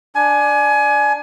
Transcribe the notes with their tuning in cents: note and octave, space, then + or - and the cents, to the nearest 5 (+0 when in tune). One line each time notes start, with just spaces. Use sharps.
D4 +10 G#5 +25